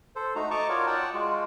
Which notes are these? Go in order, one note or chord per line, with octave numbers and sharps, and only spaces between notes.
A4 C5
A3 D#4 F#4 A#5
D#5 A5 A#5 C#6 D6
F4 F#4 A#4 C#5 D5
D5 F#5 G5 A5
G#3 F4 F#4